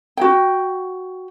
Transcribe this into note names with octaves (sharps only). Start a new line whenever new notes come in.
F#4 G5